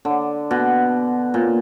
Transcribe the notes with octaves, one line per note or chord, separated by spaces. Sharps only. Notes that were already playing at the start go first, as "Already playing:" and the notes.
D3
B2
A#2